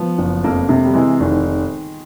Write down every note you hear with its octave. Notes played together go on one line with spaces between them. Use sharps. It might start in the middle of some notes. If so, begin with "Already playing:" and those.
Already playing: F3 B3
F#1
F2 A#3
C3
G3
E3 G#3
F1 D#3